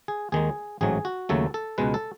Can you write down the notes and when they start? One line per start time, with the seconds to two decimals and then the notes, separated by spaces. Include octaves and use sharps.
0.08 G#4
0.32 D#2 D#3 G#3 G#4
0.81 A1 G#2 F#3 A3 G#4
1.05 F#4
1.29 D#2 C#3 F#3 A3 A4
1.54 A4
1.78 C#2 B2 G#3 B4
1.94 A4